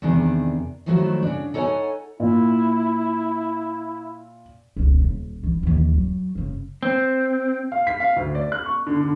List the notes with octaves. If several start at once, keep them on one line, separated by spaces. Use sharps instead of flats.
E2 C3 D#3 D4 G#4
D#3 F3 F#3 A3 E4 F#4
C#3 D4
D#4 A4 C#5 F5 F#5 G#5
A#2 E4
E1 C#2
D#1
E3
D#2 E3
F#3
F#1 C#3
C4
F5
B6
F5
D2
D5
F#6
C#6
D3
D3